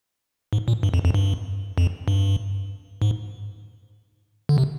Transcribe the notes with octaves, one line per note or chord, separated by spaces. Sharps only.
G#2
A#2
G2
F2
F2
G2
F2
G2
G#2
D3
C3